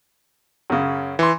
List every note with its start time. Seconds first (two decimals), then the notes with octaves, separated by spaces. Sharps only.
0.70 F#2 C#3
1.19 E3 C6